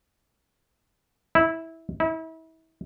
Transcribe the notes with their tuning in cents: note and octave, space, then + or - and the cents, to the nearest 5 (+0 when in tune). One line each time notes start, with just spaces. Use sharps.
E4 -15
E4 -35